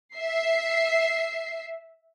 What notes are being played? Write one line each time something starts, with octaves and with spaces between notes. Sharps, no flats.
E5 C7